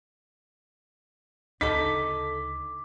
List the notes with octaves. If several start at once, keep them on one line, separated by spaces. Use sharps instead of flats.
D2 C#3 D#4 A4 D6 B6